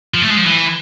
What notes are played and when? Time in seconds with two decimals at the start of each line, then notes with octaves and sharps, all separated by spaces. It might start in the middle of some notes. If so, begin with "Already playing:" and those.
0.14 F3
0.22 A3
0.30 G#3
0.37 F3
0.45 E3